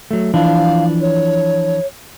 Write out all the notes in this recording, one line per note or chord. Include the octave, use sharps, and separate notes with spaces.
F#3 A3
E3 F3 D4 F5
C#5